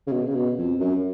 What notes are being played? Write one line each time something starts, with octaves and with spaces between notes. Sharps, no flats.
C#3
B2
C#3
B2
F2
F#2